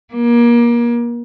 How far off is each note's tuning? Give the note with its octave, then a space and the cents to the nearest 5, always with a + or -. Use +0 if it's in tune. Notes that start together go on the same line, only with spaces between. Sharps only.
A#3 +30